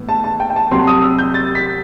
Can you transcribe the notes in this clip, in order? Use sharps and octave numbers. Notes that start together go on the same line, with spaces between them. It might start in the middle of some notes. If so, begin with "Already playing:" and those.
Already playing: A2 E3 B3
A5
A5
G5
G5
A5
C2 C3 F#3 C4 C6
D#6
E6
G6
A6
B6